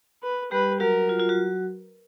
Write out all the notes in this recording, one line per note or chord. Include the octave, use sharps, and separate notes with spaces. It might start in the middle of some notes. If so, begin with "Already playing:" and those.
B4
G3 G4 B4
F#3 F#4 A#4
F4
F4
F#3 F#4